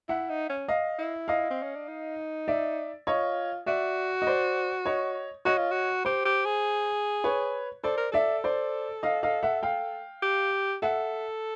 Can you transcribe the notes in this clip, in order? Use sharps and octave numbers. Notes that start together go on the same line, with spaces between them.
E4 E5 F#5
D#4
C#4
D#5 F5
E4
D#5 F5
C4
C#4
D4
D#4
D5 E5
F4 C#5 D#5
F#4 D5 E5
D#5
C5 D5
C#5 D#5
F#4 C#5 D#5
F4
F#4
G4 C5
G4
G#4
B4 C#5
A4 C5 D5
A#4
A4 D5 E5
C5 D5
D#5 F5
D#5 F5
E5 F#5
F5 G5
G4
A4 E5 F#5